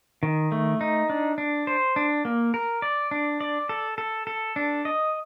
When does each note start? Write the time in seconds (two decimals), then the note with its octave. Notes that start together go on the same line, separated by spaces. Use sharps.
0.23 D#3
0.52 A3
0.81 D#4
1.10 D4
1.38 D4
1.67 C5
1.96 D4
2.25 A#3
2.54 A#4
2.82 D5
3.11 D4
3.41 D5
3.69 A4
3.98 A4
4.27 A4
4.56 D4
4.85 D#5